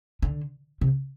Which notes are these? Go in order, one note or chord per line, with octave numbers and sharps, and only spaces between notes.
D3
C3